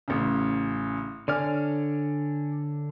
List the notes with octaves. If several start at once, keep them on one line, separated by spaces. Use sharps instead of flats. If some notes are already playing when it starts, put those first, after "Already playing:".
A1 C#3
D3 C#5 D5 G#5 F6